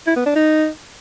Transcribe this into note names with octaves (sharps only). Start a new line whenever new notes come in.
E4
B3
D4
D#4